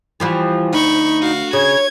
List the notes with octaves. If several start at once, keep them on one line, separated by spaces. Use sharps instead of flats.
E3 F3 G3
D2 D#4 B5 C#6
F#4 F5
C#3 C#5 G#6